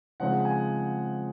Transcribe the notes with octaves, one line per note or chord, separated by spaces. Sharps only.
C#3 F3 G#3 C4 D#4 F#5
G#5